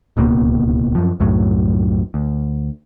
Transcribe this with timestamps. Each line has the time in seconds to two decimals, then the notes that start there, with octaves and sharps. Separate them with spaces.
0.17 D1 C#2 B2 A#3
0.95 F#2 F3
1.20 C2 F#2 A2 F#3
2.14 D2